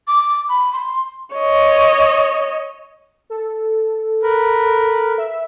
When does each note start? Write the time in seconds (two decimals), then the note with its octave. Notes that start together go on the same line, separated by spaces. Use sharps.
0.08 D6
0.49 B5
0.73 C6
1.36 C#5 D#5
3.30 A4
4.23 A#4 B4
5.18 E5